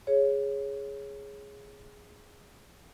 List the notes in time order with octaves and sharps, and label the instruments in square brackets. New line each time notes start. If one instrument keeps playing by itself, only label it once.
[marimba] G#4 C#5